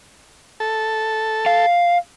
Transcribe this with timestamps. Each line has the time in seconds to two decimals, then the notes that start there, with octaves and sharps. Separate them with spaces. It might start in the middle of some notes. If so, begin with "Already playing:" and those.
0.60 A4
1.46 F5